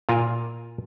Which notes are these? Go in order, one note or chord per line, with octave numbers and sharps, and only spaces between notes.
A#2 F4 A#4 F5 G5 G#5